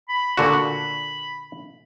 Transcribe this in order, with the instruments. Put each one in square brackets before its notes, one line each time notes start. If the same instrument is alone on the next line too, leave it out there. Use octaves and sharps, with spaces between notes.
[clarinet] B5
[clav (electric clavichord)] A#2 D3 F#4